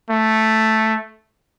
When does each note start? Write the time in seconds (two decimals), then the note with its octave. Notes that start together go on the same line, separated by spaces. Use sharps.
0.10 A3